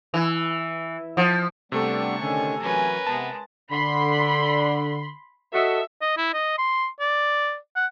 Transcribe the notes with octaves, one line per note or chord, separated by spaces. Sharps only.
E3
F3
C3 G3 A3 B3 D4 G4 A4 C#6
D3 D#3 C#4 G#5
E3 F#3 C#4 A#4 B4 G#5
C3 G#3 B3 A5
D3 B5 C6
F#4 A4 D#5 E5
D#5
E4
D#5
C6
D5
F#5